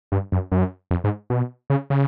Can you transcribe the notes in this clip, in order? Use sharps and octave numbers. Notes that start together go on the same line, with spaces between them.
G2
F#2
F#2
F2
G#2
B2
C#3
C#3